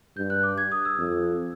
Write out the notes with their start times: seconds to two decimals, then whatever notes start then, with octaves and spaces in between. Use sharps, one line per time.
0.17 G2 G6
0.30 F#6
0.43 D6
0.58 G#6
0.72 D#6
0.85 E6
0.98 F2